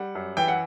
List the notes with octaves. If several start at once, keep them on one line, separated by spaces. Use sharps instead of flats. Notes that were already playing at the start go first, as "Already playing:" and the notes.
Already playing: G3 F#5
F#2
E3 G5
F#5